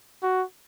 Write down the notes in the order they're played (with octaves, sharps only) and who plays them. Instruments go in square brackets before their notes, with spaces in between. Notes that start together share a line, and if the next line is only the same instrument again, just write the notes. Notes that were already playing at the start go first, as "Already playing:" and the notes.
[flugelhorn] F#4